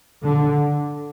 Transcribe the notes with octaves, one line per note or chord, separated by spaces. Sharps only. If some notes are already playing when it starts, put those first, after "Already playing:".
D3